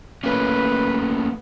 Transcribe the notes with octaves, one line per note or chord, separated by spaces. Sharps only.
A3 A#3 C#4 B4